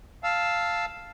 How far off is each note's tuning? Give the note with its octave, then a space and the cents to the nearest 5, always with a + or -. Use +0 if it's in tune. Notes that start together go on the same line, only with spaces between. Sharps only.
F5 +0 A5 +0 E6 +0